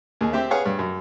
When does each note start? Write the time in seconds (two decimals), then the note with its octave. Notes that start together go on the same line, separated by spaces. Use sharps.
0.21 D#2 G#4
0.33 C4 G4 E5
0.51 G#4 B4 C#5 F5 F#5
0.66 G2
0.79 F#2